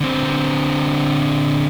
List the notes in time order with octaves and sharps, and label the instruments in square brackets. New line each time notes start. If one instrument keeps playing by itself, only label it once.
[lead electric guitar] D3 C4